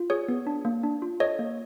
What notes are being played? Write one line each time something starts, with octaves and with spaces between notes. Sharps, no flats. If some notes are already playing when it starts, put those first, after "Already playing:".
Already playing: F4
G#4 C#5
B3
D4
A#3
D4
F4
A4 C#5 D#5
A#3